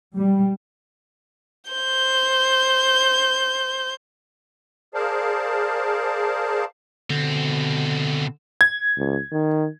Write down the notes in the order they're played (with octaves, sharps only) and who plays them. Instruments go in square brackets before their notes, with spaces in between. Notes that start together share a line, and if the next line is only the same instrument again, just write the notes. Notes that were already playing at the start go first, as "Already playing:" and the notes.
[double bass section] G3
[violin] C5 G6
[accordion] G#4 A#4 C5 D5 F5 A5
[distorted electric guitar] B2 C4 [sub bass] D3
[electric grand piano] G#6
[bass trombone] C#2
D#3